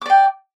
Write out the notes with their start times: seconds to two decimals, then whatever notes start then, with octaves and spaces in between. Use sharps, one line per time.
0.02 D6
0.06 D5
0.10 G5